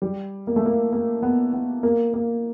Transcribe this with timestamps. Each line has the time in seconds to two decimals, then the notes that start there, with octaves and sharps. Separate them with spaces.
0.02 G3
0.47 A#3
0.56 A3
0.65 A#3
0.92 A#3
1.22 B3
1.53 B3
1.83 A#3
2.14 A#3